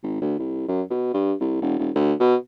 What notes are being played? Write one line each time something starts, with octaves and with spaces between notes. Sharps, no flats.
G#1
D2
C2
F#2
B2
G2
C2
E1
E1
D2
B2